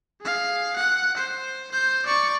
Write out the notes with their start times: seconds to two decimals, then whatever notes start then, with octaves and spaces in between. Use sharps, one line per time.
0.21 G#4 F5
0.76 F#5
1.17 C5
1.72 C5 G6
2.06 D5 C#6